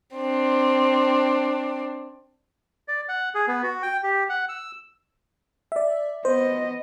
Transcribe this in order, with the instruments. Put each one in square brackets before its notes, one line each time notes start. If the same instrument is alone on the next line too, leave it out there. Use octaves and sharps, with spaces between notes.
[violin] C4 D4
[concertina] D5
F#5
G#4
B3
F#4
G5
G4
F#5
E6
[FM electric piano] D5 E5
[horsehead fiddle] B3 D#5 [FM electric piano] C5